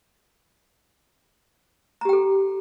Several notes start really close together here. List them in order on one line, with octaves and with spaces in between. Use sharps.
A#5 G4 G5 A4